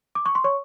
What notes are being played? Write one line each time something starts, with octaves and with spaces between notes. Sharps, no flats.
D6
C#6
C6
C#5 C#6